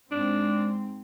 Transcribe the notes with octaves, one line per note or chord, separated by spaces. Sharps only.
G#2 C4 D4